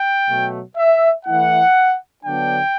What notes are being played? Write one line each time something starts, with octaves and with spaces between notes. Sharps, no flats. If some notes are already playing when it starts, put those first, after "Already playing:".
Already playing: G5
B2 F#3 A3
E5
E3 A3 E4 F#5
D3 F#3 B3 D4 G5